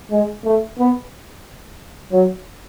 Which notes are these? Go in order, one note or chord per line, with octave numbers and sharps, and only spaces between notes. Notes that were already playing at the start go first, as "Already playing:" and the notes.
G#3
A3
B3
F#3